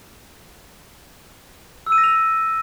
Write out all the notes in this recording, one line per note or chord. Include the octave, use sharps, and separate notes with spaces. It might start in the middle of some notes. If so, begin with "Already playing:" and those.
E6
D#7
A#6
F7